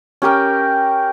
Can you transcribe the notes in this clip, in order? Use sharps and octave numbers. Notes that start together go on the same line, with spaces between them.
C#4 G4 A#4 G5